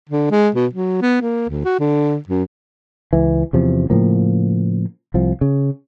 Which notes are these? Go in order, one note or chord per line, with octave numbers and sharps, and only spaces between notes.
D3
G#3
B2
F#3
B3
A#3
D2
F#4
D3
F#2
C#2 E3
E2 C3 F3
A2 C#3 F3 A#3
C2 F3
C#3